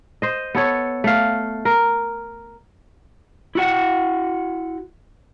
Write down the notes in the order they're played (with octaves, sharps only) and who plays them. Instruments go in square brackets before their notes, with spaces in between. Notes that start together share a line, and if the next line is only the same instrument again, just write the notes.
[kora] C5 D#5
B3 A4 C#5
A3 F5
A#4
[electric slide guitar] E4 F#4 F#5